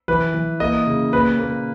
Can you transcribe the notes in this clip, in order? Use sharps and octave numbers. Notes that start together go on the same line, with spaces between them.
E3 B4
E3
A#3 D#5
C#3
A#2 B4
A#3